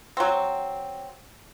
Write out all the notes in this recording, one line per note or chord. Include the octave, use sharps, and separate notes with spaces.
F#3 C4